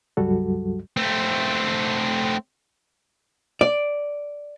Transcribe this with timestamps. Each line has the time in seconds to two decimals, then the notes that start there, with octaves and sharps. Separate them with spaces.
0.17 C#2 G2 F#3 G3 F#4 A4
0.97 A3 C4
3.61 D5